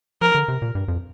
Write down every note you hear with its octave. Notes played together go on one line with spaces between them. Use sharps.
F3 A#4
D3
C3
A#2
G2
F2